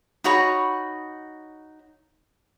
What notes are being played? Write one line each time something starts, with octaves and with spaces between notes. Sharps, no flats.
D#4 F#4 C#5 B5